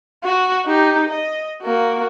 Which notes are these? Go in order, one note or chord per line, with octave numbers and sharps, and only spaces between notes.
F#4
D#4 G4
D#5
A#3 F#4